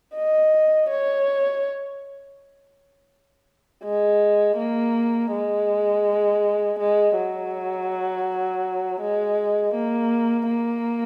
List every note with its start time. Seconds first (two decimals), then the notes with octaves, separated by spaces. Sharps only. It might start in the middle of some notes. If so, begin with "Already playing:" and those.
0.14 D#5
0.89 C#5
3.84 G#3
4.57 A#3
5.32 G#3
6.79 G#3
7.16 F#3
9.01 G#3
9.74 A#3
10.48 A#3